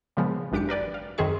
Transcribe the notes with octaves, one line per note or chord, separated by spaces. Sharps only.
A#2 C#3 F3 G#3 B3
G#1 F#2 D4 G4 D6 C#7
A#4 B4 D5 G5
F5
F#2 D#3 C4 G#4 E5 C#6